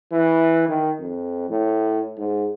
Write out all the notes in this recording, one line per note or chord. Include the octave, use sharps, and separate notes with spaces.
E3
D#3
F2
A2
G#2